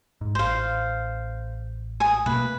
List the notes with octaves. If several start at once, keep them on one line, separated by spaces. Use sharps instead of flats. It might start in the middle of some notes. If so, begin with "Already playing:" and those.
G#2
A1 C5 F5
G#5 D#6
B2 A3 A#3 B4